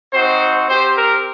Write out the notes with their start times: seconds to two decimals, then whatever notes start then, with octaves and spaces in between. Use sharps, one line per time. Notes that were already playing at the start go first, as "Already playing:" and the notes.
0.11 C4 D#4 F#4 C5
0.68 C4 G4 C5
0.97 A#4